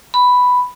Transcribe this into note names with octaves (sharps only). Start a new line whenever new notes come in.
B5